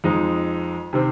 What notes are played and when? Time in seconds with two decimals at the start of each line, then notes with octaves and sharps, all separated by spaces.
0.04 F2 F3 G#3 D#4
0.93 C3 D#3 C4